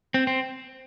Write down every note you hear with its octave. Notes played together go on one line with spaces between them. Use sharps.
C4
C4